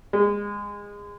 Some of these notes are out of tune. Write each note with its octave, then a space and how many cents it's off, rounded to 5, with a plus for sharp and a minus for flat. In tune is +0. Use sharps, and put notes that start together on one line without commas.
G#3 -25